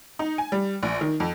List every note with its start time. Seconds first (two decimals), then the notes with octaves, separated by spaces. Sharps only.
0.19 D#4
0.38 G#5
0.52 G3
0.83 A#1
1.01 D#3
1.20 F2